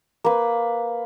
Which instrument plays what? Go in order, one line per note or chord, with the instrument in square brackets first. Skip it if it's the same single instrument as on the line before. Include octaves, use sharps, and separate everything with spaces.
[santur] A#3 B4